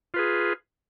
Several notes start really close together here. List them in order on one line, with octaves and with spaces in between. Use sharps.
F4 B4 G#4